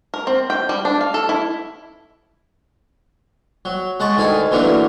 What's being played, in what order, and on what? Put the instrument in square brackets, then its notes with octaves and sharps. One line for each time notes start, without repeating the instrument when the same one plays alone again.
[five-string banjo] A#4
C4
G5
G3
D4
F5
A4
E4
[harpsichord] F#3
G#3 F#5 A5 C#6
D2 D#3 A4 G#5 A5
D3 E3 F#3 A3 A#3